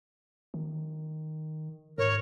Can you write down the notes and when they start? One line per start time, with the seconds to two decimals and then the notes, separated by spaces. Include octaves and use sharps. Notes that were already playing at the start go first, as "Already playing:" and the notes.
0.54 D#3
1.98 G#2 A#4 C#5